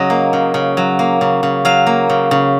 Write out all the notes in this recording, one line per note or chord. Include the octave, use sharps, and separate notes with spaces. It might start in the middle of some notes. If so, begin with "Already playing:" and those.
Already playing: C#3 F#3 D#5
A#3
C#3
C#3
F#3
A#3
C#3
C#3
F#3 F5
A#3
C#3
C#3